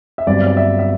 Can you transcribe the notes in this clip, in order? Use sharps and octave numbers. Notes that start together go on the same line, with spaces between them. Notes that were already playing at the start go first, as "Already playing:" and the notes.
E5
G1 G2 F#3 C4 D5
D5
E5
E5